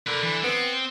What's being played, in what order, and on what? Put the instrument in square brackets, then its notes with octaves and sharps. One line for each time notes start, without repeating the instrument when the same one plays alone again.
[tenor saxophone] D3 [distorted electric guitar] A#4 B4
[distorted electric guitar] E3
[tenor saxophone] B3 [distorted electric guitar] C4